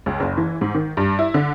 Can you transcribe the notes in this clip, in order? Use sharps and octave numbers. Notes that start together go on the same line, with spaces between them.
C#2
F#1
E3
G#2
D#3
G2
E4
D3